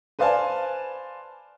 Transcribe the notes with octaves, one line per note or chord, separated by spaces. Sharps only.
B4 C5 D5 F5 G#5 A5